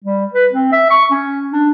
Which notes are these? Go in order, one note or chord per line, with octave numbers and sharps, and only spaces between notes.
G3
B4
C4
E5
C#6
C#4
D4